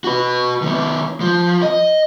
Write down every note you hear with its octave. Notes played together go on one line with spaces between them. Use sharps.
F#4 B4
D#3 B3
F3
D#5